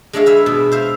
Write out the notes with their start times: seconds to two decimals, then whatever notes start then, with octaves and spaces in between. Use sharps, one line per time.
0.13 G#3 D4 C#5 E5 F5
0.26 B4 E5 G#5
0.46 B2
0.72 C5 E5 F5